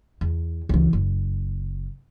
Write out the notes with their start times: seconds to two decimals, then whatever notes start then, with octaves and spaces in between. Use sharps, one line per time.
0.21 E2
0.69 C#2 E3
0.93 F#1